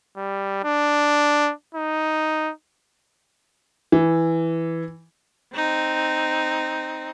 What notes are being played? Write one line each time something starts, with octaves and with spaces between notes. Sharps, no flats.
G3
D4
D#4
E3
C4 D#4